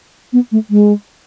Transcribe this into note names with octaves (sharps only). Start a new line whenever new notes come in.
B3
A3
G#3